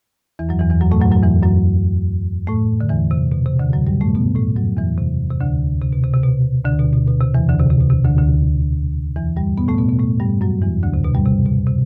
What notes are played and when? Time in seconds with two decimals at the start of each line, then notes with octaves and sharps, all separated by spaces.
0.39 E2 E3
0.49 F#2 F#3
0.59 E2 E3
0.70 E2 E3
0.81 F#2 F#3
0.91 A2 A3
1.01 F#2 F#3
1.12 F#2 F#3
1.23 E2 E3
1.43 F#2 F#3
2.47 A2 A3
2.81 D3
2.89 E2 E3
3.11 C3
3.32 B2
3.46 C3
3.59 D2 D3
3.73 F#2 F#3
3.87 G2 G3
4.01 A2 A3
4.15 B2 B3
4.35 A2 A3
4.56 F#2 F#3
4.77 E2 E3
4.98 C3
5.31 C3
5.41 D2 D3
5.82 C3
5.93 B2
6.03 C3
6.14 C3
6.23 B2
6.65 D2 D3
6.79 B2
6.93 B2
7.07 B2
7.21 C3
7.35 E2 E3
7.49 D2 D3
7.59 C3
7.71 C3
7.80 B2
7.90 C3
8.04 D2 D3
8.18 D2 D3
9.16 E2 E3
9.36 G2 G3
9.58 B2 B3
9.68 A2 A3
9.78 B2 B3
9.89 B2 B3
9.99 A2 A3
10.20 G2 G3
10.41 F#2 F#3
10.62 E2 E3
10.83 D2 D3
10.94 C3
11.04 B2
11.14 G2 G3
11.25 C3
11.46 B2
11.67 C3